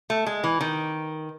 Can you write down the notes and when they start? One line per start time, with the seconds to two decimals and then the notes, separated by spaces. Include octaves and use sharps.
0.10 A3
0.27 G#3
0.44 E3
0.61 D#3